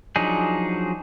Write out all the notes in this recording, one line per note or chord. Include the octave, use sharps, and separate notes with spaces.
F3 F#3 D4 D#4 G#4